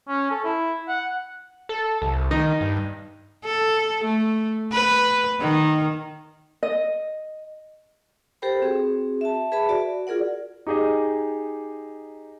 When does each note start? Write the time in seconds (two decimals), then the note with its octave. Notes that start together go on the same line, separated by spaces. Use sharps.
0.08 C#4
0.31 A4
0.44 E4
0.89 F#5
1.69 A4
2.02 C2
2.31 D#3 D#4
2.61 G2
3.44 A4
4.04 A3
4.72 B4
5.40 D#3
6.63 D#5
8.42 G4 A4 A#4 C5 G5 B5
8.62 C4 F#4 G#4
9.21 E5 A5
9.52 G#4 B4 E5 A5 B5
9.69 F#4 D5
10.07 F4 G#4 A#4 D5 F#5
10.67 D#4 G4 G#4 D#5